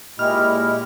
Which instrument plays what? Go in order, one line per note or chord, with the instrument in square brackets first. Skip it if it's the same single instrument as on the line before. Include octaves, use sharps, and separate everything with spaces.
[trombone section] A#2 [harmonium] G#3 E4 G4 [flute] D#5 [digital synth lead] F6